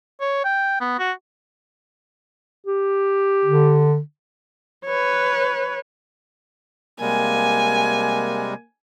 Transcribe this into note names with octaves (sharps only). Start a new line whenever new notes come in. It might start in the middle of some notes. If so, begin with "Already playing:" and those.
C#5
G5
B3
F#4
G4
D3
B4 C#5
C3 G3 G#3 A#3 G#5